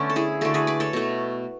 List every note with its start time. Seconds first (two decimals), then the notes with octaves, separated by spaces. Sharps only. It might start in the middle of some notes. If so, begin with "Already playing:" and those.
Already playing: D3 A3 B3 C#4
0.10 A4
0.16 E4 G#4
0.41 D3 A3 F#4 A4
0.54 G#4 B4
0.67 B4 D5
0.80 A4 C#5
0.93 B2 A3